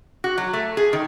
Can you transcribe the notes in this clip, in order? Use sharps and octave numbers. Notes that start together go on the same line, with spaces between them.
F#4
F#3
A3
G#4
D#3